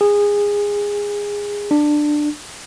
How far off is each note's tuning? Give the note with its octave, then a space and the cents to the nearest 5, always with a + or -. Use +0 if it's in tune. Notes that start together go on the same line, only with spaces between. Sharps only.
G#4 -20
D4 +15